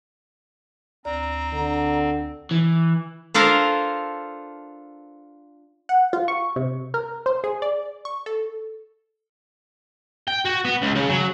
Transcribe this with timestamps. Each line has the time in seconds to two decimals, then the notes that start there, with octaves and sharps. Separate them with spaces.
1.05 D2 C4 D5 A#5
1.53 D3
2.51 E3
3.34 D4 F4 A4 A#4 C5
5.89 F#5
6.13 F4
6.28 C#6
6.56 C3
6.94 A#4
7.26 C5
7.44 G#4
7.62 D5
8.05 C#6
8.26 A4
10.28 G5
10.45 F#4
10.65 B3
10.82 C#2
10.95 C#3
11.09 F#3